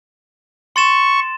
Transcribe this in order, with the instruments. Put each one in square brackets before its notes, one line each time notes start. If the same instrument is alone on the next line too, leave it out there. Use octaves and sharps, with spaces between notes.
[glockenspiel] C6 A6 E7 [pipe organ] C#6